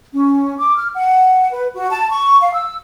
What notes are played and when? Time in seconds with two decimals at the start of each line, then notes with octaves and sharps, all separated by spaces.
0.13 C#4
0.59 D6
0.77 F6
0.95 F#5
1.53 B4
1.75 F#4
1.90 A5
2.11 C#6
2.41 F5
2.53 E6